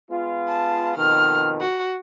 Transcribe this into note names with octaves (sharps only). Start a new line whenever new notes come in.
G#3 B3 F4
A5
F2 B2 D#3 F6
F#4